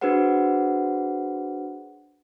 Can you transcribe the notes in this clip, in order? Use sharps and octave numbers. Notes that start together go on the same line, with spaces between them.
D4 F#4 G#4 B4 C5 F#5